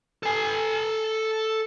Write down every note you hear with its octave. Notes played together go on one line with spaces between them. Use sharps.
A4 G#5